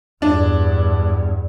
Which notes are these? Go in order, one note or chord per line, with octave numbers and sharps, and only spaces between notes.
E2 G2 D4